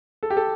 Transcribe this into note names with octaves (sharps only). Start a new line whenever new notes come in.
A4
G4
A4